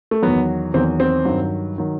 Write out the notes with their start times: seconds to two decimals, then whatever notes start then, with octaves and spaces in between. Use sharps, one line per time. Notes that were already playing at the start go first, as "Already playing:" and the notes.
0.11 A3
0.23 E2 D#3 F#3 B3
0.74 E2 D#3 F#3 C4
1.00 C4
1.25 G2 D#3 F#3
1.78 D#3 F#3